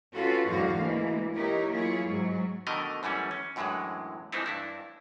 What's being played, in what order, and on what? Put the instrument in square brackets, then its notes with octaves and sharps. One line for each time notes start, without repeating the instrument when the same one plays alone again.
[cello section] C#4 F4 F#4 A4 B4
E2 G#2 D3 F#3 F#4 F5
D2 E3 G#3 A#3
D#4 E4 G4 A#4 C#5
F#3 A#3 E4 F4 G#4 C#5
G#2 F#3
[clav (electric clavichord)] B2 D3 D#3 A3 A#4 D#5
F#2 E3 G3 A3 C#4
C#4
F#2 A2 D3 E3 F#3 G#3
E3 F3 A3 C4 D#4 E4
G2 D4 E4